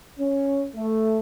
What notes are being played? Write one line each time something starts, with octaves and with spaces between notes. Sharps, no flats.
C#4
A3